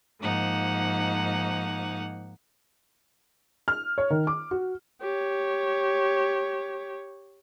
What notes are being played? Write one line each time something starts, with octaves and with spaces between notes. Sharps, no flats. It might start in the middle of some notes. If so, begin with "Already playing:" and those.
G#2 F3 A#3 D#4 F#5
F6
C#5
D#3
D6
F#4
G4 C#5